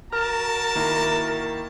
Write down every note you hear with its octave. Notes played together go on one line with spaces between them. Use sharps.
F#4 A#4 A5 F6
D#3 A#3 E4